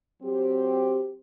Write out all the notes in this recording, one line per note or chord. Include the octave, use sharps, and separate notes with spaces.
F#3 C4 G4 C5